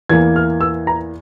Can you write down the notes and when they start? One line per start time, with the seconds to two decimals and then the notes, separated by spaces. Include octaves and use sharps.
0.10 E2 E3 A#3 G#6
0.36 F6
0.61 E6
0.87 A#5